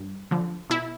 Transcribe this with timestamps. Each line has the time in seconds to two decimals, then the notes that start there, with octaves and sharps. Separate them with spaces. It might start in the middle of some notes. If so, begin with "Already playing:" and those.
Already playing: G2
0.31 D3 F3
0.70 B2 E4